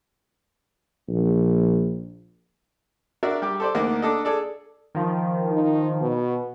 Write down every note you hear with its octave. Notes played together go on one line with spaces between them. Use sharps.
A#1
D4 F#4 A#4 D5 E5
G3 G4
A4 C5 D5
D2 A#3 D4 D#4
D4 A4 D#5
G#4 A4 D5
D#3 F3
D#4
B2